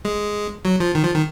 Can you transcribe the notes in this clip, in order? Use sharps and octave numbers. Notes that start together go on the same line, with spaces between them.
G#3
F#3
F3
D#3
F3
D#3